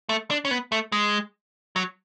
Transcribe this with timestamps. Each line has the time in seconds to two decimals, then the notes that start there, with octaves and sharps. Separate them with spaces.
0.09 A3
0.30 D4
0.45 C#4
0.51 B3
0.72 A3
0.92 G#3
1.76 F#3